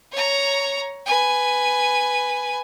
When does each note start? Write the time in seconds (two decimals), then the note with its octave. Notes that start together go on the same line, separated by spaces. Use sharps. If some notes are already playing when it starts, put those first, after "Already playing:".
0.12 C#5 A#5
1.06 B4 G#5